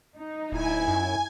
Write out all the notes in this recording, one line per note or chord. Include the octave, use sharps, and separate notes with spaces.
D#4
D1 E4 G#5
F#2